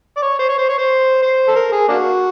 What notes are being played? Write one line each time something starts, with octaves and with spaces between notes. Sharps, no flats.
D5
C#5
C5
C#5
C5
C#5
C5
C5
A4
A#4
G#4
A#3 D4 F#4